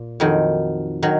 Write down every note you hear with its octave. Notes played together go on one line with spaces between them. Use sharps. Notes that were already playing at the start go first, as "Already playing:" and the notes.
Already playing: A#2
F2 D#3 F#3
D#3 F#3